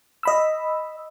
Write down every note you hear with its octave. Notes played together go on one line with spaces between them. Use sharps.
D#5 B5 E6